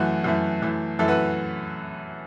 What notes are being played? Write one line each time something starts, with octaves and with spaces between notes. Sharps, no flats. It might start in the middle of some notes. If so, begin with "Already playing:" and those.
Already playing: F#2 E3 A3 F#4
F#2 E3 A3
F#2 E3 A3
F#2 E3 A3 E4 A4
F#4 B4